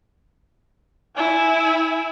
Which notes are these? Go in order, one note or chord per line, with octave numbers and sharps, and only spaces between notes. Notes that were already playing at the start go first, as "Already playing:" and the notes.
E4 G#5